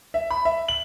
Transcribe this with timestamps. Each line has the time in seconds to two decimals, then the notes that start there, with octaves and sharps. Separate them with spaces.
0.14 E5
0.31 B5
0.45 E5
0.68 F#7